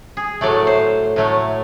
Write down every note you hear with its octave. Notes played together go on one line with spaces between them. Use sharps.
G#4
A2 F#3 A3 D5
C5
A2 F#3 A3